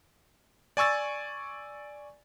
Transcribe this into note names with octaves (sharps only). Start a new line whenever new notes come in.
D5 G#5 C#6 E6 A6